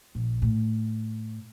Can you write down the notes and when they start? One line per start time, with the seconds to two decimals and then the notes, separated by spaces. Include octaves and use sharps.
0.15 A#1
0.42 A2